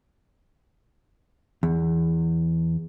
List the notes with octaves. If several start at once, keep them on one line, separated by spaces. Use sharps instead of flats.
E2